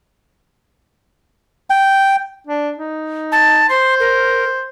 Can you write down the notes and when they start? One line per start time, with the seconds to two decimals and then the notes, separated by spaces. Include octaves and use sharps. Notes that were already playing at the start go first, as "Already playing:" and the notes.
1.70 G5
2.47 D4
2.78 D#4
3.32 A5
3.69 C5 C6
4.00 A#4